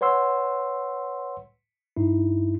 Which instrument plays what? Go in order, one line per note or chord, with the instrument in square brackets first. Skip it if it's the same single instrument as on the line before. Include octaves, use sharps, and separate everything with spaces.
[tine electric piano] B4 C#5 F#5 C6 E6
G2 D#4 E4